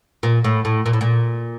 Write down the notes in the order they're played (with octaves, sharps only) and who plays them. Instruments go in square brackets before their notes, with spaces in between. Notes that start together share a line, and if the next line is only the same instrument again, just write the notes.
[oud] A#2
A2
A2
A#2
A2
A#2